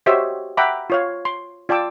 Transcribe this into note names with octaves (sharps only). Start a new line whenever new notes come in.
F#4 G4 C5 C#5 D#5 E5
E5 F#5 G5 A#5 B5 D6
F4 C#5 F5
C6
F4 D5 G5 A5 D6 E6